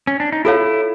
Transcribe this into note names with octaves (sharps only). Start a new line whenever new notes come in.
C#4
D4
D#4
E4 F4 A4 C#5 F5